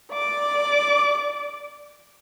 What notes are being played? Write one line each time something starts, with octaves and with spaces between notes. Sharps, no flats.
D5 D6